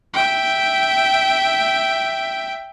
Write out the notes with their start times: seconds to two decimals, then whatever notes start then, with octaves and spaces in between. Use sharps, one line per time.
0.13 E5 G5